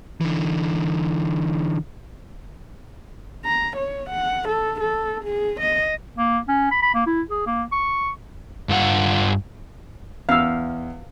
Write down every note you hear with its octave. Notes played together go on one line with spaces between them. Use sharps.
D3 E3
A#5
C#5
F#5
A4
A4
G#4
D#5
A#3
C#4
B5
B5
A#3
E4
G#4
A#3
C#6
G2 F4 F#5
E2 F5 E6